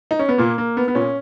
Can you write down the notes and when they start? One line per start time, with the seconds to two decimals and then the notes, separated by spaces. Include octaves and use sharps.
0.11 D#4
0.19 C#4
0.29 B3
0.38 A#2 A#3
0.58 A#3
0.77 B3
0.88 B3
0.95 A#2 C#4